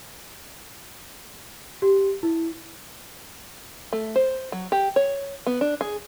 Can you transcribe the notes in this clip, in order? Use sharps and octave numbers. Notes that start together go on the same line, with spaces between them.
G4
E4
A3
C5
F#3
G4
C#5
B3
D4
G#4